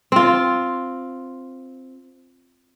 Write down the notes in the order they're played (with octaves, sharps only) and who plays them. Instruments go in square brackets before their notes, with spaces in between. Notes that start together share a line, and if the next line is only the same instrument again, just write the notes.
[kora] C4 F4